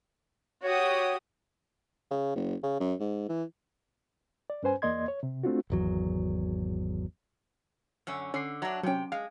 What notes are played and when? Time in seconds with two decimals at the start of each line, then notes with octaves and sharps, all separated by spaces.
0.63 F#4 G4 C#5 D#6
2.11 C#3
2.36 F#1
2.63 C#3
2.80 F#2
3.00 G#2
3.29 E3
4.50 D5
4.63 G2 C#4 B4 C5 G#5
4.82 E2 A#3 D5 D#5 C6 G#6
5.08 C#5
5.23 C3
5.43 A3 C4 D4 F4 F#4
5.70 G#1 E2 F#3
8.07 F#2 D3 C#4
8.34 D3 C#4 C7
8.62 F#3 D4 E5 A#5
8.83 C3 F#3 C#4 G5
9.12 G#3 F5